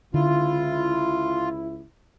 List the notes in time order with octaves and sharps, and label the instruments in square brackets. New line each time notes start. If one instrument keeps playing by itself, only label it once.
[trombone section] C#2 E4 [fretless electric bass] D3 [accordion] F4